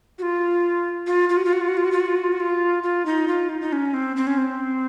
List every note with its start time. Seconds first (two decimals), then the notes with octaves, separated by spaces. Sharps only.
0.19 F#4
0.22 F4
1.07 F4
1.29 F4
1.37 F#4
1.45 F4
1.53 F#4
1.61 F4
1.68 F#4
1.77 F4
1.84 F#4
1.92 F4
2.00 F#4
2.08 F4
2.16 F#4
2.24 F4
2.32 F#4
2.40 F4
2.83 F4
3.06 D#4
3.28 F4
3.49 D#4
3.61 D#4
3.72 C#4
3.94 C4
4.16 C4
4.27 C#4
4.38 C4